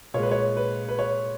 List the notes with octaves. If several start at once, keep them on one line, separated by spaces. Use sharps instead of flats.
A#2 G#3 C#5
B4
C#5
B4
B4
C#5